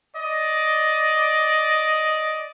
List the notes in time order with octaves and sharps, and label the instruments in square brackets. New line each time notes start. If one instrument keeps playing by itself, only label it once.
[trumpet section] D5 D#5